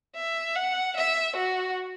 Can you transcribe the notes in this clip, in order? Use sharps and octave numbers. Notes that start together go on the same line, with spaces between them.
E5
F#5
E5
F#4